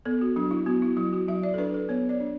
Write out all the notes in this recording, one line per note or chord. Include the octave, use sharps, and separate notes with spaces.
B3 A4
F#4
F#3 D4
E4
B3 F#4
E4
F#3 E4
F#4
F#3 E5
D5
A4
D4 B4
A4
B3 C#5
D5
D4